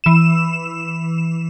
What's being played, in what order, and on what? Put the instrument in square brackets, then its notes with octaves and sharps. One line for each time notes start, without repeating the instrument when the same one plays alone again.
[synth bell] E3 E7